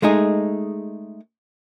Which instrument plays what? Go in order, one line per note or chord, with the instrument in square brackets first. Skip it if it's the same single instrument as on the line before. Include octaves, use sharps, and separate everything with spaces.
[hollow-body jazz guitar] G#3 A3 D#4 G#4